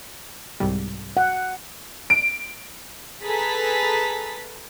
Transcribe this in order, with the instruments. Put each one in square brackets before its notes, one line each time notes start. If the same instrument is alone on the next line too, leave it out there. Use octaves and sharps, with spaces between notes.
[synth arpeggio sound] C2 G#2 G3
[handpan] F#5
[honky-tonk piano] D7
[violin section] G#4 A4 B4 A#5 A6 B6